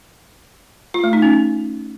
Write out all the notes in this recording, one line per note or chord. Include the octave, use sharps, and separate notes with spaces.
F4
A3
D#4
C#4